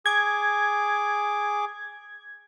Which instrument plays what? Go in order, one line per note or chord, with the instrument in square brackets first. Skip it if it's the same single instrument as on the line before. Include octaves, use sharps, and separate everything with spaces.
[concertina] G#4 D6 [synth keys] G#6